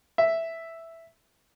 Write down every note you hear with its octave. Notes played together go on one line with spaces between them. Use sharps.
E5